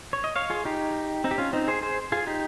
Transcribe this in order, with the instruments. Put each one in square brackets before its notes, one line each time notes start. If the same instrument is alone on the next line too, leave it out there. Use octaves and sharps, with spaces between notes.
[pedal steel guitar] C#5
D#5
C#5 F5
F4 G#4
D#4 G4
C4 D#4
G4
C#4 F4
C4 D#4
G#4 C5
G#4 C5
F4 G#4
D#4 G4